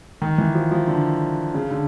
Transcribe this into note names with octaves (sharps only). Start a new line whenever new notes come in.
D#3
E3
F3
F3
D3
C#3
D3